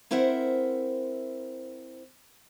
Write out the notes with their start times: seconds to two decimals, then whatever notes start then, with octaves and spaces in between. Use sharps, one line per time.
0.11 C4 E4 A#4 C5 E5 F#5